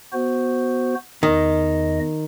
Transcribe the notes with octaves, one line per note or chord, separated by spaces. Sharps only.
B3 F#4 C5
E2 D#3 D#5